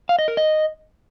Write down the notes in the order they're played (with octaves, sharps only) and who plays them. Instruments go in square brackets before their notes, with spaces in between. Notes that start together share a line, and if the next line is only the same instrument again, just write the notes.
[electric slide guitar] F5
D#5
A#4
D#5